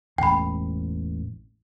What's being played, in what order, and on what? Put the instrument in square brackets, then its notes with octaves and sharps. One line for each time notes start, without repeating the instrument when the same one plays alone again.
[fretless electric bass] E1 A1 [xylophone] G5 B5